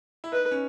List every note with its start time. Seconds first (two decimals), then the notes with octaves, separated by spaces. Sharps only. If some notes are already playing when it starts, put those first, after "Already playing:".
0.24 E4
0.32 D#4 B4
0.51 C#4